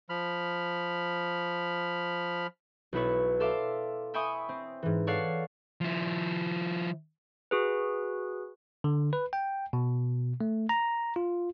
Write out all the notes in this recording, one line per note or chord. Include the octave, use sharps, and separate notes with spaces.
F3 B5 F6
B1 B3 E4 B4 C#5
A4 E5 F5 C6 D6
E5 G5 G#5 B5 C#6 D#6
C4
G#2 E3
A4 C#5 D5 F5 F#5 C7
F3 E4
F#4 G#4 B4
D3
B4
G5
B2
A3
A#5
F4